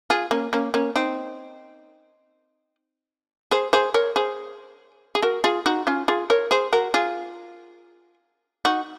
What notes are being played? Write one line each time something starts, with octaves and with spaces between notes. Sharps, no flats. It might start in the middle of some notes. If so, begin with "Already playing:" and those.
F4 G#4
A#3 C#4
A#3 C#4
A#3 C#4
C4 D#4
G#4 C5
G#4 C5
A#4 C#5
G#4 C5
G#4
F#4 A#4
F4 G#4
D#4 F#4
C#4 F4
F4 G#4
A#4 C#5
G#4 C5
F#4 A#4
F4 G#4
D#4 F#4